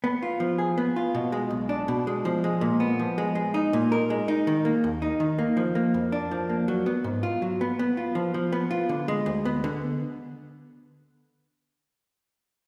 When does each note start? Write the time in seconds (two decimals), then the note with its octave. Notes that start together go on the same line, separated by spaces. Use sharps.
0.04 B3
0.22 F4
0.40 F3
0.58 G#4
0.78 B3
0.96 F4
1.15 B2
1.32 G#3
1.51 B1
1.69 D4
1.88 B2
2.07 G#3
2.25 F3
2.44 G#3
2.61 A#2
2.80 B3
2.99 F3
3.18 G#3
3.35 G#3
3.54 D#4
3.73 A#2
3.92 A#4
4.10 G#3
4.28 D#4
4.47 D#3
4.65 A#3
4.84 D#2
5.02 D#4
5.20 D#3
5.38 A#3
5.57 F3
5.75 A#3
5.94 F2
6.12 D4
6.31 F3
6.49 A#3
6.68 F#3
6.86 B3
7.04 G#2
7.23 F4
7.42 F#3
7.61 B3
7.79 B3
7.97 F4
8.15 F3
8.34 F3
8.52 B3
8.71 F4
8.89 D3
9.08 G#3
9.26 D2
9.45 B3
9.64 D3